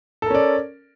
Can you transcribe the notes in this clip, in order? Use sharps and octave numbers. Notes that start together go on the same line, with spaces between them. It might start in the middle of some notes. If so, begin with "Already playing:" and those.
C#4 A4 A#4 D5